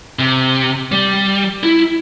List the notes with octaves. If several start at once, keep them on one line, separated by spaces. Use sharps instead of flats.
C3
G3
E4